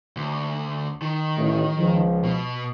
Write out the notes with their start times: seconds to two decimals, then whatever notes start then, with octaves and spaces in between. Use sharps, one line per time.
0.17 D2
1.02 D#3
1.37 A1
1.77 C#2 F3
2.24 B2